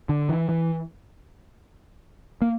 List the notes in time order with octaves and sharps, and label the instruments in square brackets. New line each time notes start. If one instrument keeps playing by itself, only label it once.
[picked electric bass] D3
E3
E3
A#3